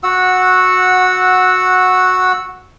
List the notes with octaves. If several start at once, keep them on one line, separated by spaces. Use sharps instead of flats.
F#4 F#5 E6